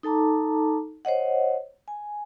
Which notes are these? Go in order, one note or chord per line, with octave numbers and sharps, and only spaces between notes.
D#4 A4 A5 A#5 D6
C5 C#5 D#5 F#5
G#5